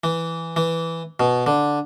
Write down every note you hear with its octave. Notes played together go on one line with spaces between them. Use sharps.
E3
E3
B2
D3